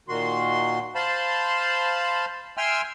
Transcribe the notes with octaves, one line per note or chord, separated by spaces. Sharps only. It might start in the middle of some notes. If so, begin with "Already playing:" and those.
A#2 D#3 F#4 C6
C5 F5 A5 B5 C6
E5 G5 G#5 C6 E6 F6